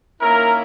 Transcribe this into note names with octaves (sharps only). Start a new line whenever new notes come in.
D#3 A#3 C#4 E4 A#4